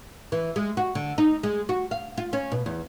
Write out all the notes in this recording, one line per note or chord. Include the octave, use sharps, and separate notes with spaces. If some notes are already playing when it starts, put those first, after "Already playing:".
E3
G#3
F#4
D3
D#4
G#3
F#4
F5
F4
C#4
B2
E2